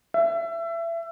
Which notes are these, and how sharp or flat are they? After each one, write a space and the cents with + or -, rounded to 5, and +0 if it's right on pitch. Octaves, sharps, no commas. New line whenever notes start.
E5 +25